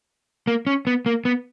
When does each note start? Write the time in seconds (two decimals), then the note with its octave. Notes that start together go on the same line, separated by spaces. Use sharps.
0.47 A#3
0.67 C#4
0.87 B3
1.06 A#3
1.25 B3